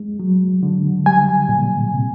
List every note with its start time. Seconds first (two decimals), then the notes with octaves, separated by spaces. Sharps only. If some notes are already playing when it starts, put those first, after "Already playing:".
Already playing: G#3
0.20 F#3
0.63 D3
1.06 G3 G#5
1.49 A#2
1.93 C3